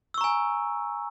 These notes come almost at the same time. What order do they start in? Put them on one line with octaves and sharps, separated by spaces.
E6 C#6 A#5 G#5